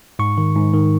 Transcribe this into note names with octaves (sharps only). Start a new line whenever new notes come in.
G#2 C#6
D#3
G#2
D#3